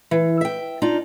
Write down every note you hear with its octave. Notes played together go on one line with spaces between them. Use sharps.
E3
E5 G5
D4 D#4 F4